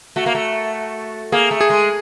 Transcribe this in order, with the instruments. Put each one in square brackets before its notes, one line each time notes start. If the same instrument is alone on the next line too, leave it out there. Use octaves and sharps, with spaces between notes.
[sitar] A3 [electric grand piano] F#4
[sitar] A#3
A3
[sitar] A#3 [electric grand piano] G#4
[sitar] A3
[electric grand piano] G#4
[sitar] G#3